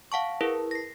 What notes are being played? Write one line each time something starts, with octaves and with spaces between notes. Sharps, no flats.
F5 F#5 A5 C#6
E4 G#4 A#4 B4
A#6 C7